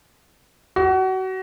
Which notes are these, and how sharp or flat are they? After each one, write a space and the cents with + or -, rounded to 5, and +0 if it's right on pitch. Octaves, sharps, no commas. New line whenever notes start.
F#4 +30